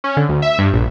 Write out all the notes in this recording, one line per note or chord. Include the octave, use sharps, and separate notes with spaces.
C#4
D3
D2
E5
G2
A#1